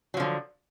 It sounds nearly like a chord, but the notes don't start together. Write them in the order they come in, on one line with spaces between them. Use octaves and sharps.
F#3 F3 D3